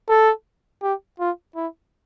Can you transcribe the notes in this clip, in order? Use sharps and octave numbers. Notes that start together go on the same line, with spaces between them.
A4
G4
F4
E4